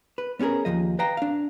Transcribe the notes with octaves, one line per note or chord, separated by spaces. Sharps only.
B4
B3 C#4 F#4 G#4 A#4
D#2 A#2 F3 D#5
B4 D#5 F5 G5 A#5
D4 F5